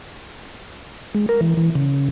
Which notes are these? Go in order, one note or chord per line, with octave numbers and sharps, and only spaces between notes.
G#3
A#4
E3
E3
C#3